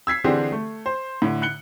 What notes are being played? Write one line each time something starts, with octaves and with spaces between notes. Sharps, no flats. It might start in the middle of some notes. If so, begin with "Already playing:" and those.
E6 G#6 B6 C7
D3 E3 C4 D4 G4 G#4
A3
C5
A2 D3
F#6 C#7 G7